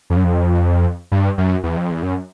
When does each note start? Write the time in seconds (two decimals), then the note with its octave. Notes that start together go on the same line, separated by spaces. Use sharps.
0.10 F2
0.17 F#2
0.24 F2
1.12 G2
1.38 F#2
1.63 E2
1.77 F2
1.91 E2
2.03 F#2